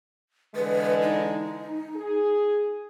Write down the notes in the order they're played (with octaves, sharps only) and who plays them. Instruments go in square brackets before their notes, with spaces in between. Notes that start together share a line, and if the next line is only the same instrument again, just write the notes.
[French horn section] D3 E3 G#3 [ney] B4
[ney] D#4
[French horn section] G#4